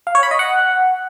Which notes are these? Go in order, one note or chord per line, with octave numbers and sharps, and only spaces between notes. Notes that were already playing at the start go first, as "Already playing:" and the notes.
F5
C#5
B5
D#5
F#5